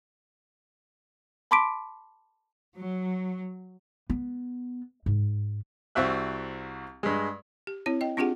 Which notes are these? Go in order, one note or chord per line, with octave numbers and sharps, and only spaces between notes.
A5 B5 C6 D6 B6 D7
F#3
B3
G#2
C2 C4 F#4 E5 F#6
G2 G#3
G4
C4 E4 C#5
D#5 G5
C4 D4 F4 G4 G#4 F#5